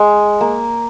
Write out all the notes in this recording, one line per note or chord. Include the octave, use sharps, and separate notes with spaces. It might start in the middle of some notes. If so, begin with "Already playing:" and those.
Already playing: G#3
A#3